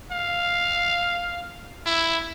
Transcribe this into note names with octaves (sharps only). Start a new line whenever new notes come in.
F5
E4